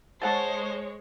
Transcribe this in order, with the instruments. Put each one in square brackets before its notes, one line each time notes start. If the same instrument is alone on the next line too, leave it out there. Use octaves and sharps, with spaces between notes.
[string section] G#3 C#5 [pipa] A4 F#5 A5 [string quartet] C5